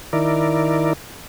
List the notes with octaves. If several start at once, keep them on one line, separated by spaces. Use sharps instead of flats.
D#3 E4 A#4 D5